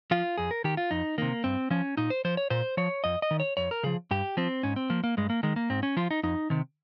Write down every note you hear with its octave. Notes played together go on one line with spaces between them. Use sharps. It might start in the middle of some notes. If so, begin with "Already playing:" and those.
F3 F4
F2 G#4
A#4
D#3 G4
F4
F2 D#4
C3 D#3 A#3
G2 C4
F3 C#4
A#2 D#4
C5
F3 C5
C#5
A#2 C5
F3 C#5
F2 D#5
D#5
D#3
C#5
F2 C#5
A#4
C#3 F3 G#4
G2 G4
F3 C4
G#2 C#4
C4
F3 A#3
A#3
G2 G#3
A#3
D#3 G#3
A#3
G#2 C4
C#4
F3 F4
D#4
F2 D#4
C3 D#3